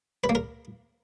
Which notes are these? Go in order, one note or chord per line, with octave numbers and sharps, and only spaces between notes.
B4
A#3
A#4